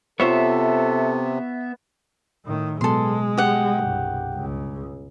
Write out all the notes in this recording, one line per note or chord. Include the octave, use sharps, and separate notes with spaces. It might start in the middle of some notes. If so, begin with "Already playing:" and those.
C3 B3 F4 A4 C5 C#5 E5
A2 D#3
B2 F#3 G#3 B3 A4 C6
G4 G#4 F#5
C2 G2
C#2